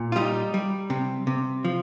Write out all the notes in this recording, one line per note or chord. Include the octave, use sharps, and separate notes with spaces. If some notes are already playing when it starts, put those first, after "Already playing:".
Already playing: A#2
F4
G3 D#4
G3
C3
C3
F3